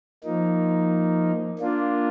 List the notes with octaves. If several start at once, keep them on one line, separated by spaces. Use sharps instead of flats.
F3 A#3 D#4
A#3 D4 F4